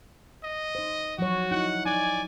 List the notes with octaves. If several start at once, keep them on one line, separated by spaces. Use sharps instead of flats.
D#5
D#4 C5
F3 F#3 F#4 C#5
D#4 E4 F#5
D#4 D5 G#5